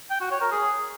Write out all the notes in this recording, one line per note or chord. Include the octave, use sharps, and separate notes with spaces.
G5
F#4
C#5
A#4
G#4